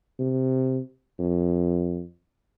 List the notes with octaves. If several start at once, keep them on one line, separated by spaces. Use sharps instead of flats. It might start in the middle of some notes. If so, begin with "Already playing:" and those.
C3
F2